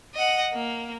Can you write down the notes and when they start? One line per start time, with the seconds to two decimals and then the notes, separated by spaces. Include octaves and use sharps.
0.14 D#5 F#5
0.53 A#3